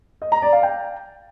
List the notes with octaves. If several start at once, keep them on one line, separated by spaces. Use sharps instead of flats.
D#5
A#5
D5
F5
G5